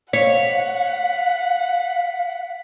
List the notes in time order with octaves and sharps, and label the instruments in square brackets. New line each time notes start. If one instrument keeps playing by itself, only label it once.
[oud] C#5 [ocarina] F5 [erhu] F#5 [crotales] B6